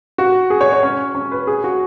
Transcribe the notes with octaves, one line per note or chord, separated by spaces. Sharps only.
F#4
G#4
C#5
C#5
C#4
C#4
B4
G#4
F#4